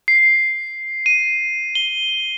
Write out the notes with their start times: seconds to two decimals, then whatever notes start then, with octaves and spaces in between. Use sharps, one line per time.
0.08 C7
1.06 D#7
1.75 G7